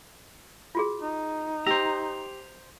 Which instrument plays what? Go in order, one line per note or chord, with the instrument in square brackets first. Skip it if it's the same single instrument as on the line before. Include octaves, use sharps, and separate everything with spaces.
[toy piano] F4 F#4 G#4
[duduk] D#4
[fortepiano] G4 [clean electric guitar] C5 A#5 [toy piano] E6